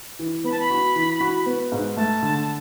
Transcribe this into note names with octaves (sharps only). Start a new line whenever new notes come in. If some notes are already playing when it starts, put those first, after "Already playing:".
E3
B3 B5
A5
B5
F#4
E3
F#4
B3
G#2
A3 A5
D3